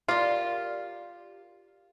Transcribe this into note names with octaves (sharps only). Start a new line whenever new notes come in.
F4 G4 A#4 D5